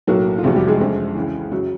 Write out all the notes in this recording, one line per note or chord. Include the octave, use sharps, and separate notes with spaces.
B1 A2 F#3 A#3 F#4
F4
F1 E2 C3 F#4
G3 G4
G#3 G#4
F#1 F2 D3
C#2 C#3 E3
F#2 C#3 F#3 F#4